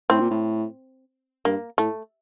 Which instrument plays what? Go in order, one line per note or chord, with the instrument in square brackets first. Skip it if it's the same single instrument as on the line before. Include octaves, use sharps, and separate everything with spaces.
[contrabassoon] A2 [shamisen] C4
[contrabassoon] A#2
A2
[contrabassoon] G2 [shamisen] A#3
[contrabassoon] A2 [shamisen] A3